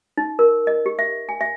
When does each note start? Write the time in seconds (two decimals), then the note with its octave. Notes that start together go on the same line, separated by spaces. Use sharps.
0.17 D#4
0.39 A#4
0.67 D#5
0.86 G4
0.99 E5
1.29 G#5
1.41 E5